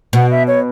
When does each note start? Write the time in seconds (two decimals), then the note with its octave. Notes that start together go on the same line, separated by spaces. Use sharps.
0.13 B2 F#5
0.31 E5
0.48 C#5